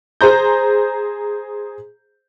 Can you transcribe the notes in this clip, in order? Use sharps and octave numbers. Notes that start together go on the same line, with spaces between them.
G#4 C5 A#5 G6